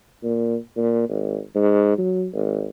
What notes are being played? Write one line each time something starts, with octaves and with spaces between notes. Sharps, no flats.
A#2
A#2
G#1
G#2
F#3
G#1